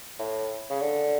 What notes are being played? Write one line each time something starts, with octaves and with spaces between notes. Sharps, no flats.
A2
C#3
D3